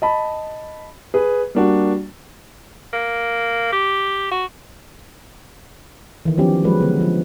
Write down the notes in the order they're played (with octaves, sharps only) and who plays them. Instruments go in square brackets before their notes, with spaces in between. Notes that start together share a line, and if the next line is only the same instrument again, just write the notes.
[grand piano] D#5 A5 B5
G#4 B4
G3 A#3 D4 F#4
[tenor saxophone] A#3
G4
F#4
[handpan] D#3 E3
F3 F#3 B3 C#4 G4
F3 F#3 G#3 B4
D3 B3
F3